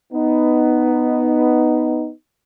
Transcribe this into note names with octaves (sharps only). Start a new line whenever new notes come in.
B3 D#4